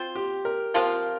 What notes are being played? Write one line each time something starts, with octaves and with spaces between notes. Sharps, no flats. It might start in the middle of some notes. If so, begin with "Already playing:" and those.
Already playing: C4 F4 C5
G4
A#4
C3 F3 C4 F4 A#4